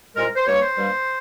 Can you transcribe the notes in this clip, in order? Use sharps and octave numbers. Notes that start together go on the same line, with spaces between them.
C2 A#2 G#3 A#4
C5
G2 G3 A#3 C#5
C5
G2 G3 A#3